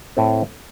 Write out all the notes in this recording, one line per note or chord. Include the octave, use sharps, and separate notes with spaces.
A2 A3 C4